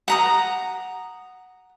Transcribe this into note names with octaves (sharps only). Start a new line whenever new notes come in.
F#5 A#5 D#6